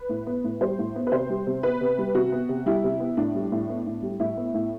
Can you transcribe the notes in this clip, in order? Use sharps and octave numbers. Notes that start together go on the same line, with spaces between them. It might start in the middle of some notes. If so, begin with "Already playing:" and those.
Already playing: B4
A2
B3
A2
G3 C5
A2
B3
B4
C3 C5
G3
C3
B3 B4
C3
G3
C3 F#4
B3
C3
G3 E4
C3
B3
A2 D4
G3
A2
B3
A2
G3
A2 E4
B3
A2